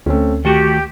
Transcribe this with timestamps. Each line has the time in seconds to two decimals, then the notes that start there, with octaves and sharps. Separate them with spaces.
0.06 D2 A3 C4 C#4
0.45 D#3 A3 F#4 G4 G5